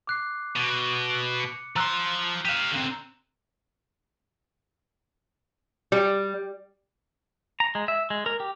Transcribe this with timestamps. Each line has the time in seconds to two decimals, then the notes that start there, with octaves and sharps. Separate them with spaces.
0.07 D6 F#6 C7
0.56 B2
1.40 C#7
1.76 F3 A#5 C6 E6 F#6
2.45 G4 F5 D#7 E7
2.71 D3 C4
5.92 G3
7.60 A#5
7.75 G#3
7.88 E5
8.10 G#3
8.26 A#4
8.40 G4